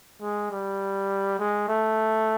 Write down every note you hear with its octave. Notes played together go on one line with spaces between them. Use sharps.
G#3
G3
G#3
A3